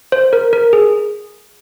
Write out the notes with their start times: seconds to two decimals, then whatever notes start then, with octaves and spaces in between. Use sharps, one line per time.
0.12 C5
0.33 A#4
0.53 A#4
0.73 G#4